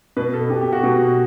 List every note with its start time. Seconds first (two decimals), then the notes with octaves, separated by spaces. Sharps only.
0.17 B2 B4
0.34 A4
0.50 B2 G4
0.61 G4
0.73 F#4
0.83 B2